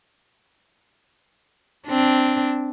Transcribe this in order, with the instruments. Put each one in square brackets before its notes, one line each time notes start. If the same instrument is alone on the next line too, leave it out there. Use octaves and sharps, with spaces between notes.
[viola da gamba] C4 D4